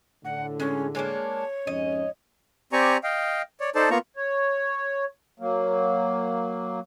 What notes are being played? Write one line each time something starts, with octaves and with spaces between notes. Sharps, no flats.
A2 D3 F#5
G#3 C#4
G#3 A#3 D4 C#5
F2 G#2 C#4 D#5
C4 G4 D5 G#5 A#5 C#6
D#5 F5 G5
C#5 D5
D#4 A4 C5 D5 A5
A#3 B3 F4 A#5 C#6
C#5
F#3 A#3